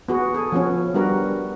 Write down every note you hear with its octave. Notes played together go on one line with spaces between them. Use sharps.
B3 F#4 G#4
G#4 A4
F3 B3 C#4
G3 B3 D4 F#4 A#4 B4